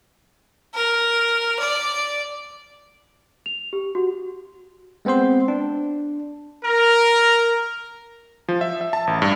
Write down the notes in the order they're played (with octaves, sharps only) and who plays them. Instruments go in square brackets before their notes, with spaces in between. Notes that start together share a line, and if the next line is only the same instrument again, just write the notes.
[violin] A#4
D5
[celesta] F7
G4
F#4
[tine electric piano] G#3 B3 C4 C5 C6
D4
[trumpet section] A#4
[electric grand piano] F3
E5
E5
A5
A1
G2